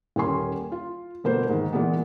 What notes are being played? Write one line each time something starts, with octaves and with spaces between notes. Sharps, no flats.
D#1 A#3 C#4 G#5 C6
F4
G1 B2 A#3 B4 C5
G#2 D#3
A#2 E3 G#3 A#3 B3